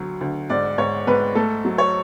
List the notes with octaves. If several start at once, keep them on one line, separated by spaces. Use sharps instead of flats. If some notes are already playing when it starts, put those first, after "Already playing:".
Already playing: D2 F#3
D2
G#2 D5
G#2 C#5
G#2 B4
A3 A4
F#3
C#5